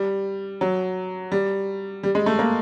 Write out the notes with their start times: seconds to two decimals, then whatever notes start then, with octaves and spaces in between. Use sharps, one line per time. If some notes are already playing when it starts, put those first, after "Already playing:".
Already playing: G3
0.61 F#3
1.32 G3
2.03 G3
2.15 G#3
2.26 A3
2.39 A#3